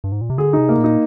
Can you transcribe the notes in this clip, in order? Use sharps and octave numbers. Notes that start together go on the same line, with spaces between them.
G2
G#2
A#2
C3
D3 G#4
C3 D#4
A#3
A#2
D#4